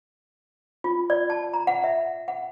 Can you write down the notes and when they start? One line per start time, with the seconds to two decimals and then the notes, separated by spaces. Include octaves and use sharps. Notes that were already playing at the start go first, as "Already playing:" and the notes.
0.84 F4
1.10 D5
1.30 A5
1.54 A#5
1.67 F#5
1.84 E5
2.28 F#5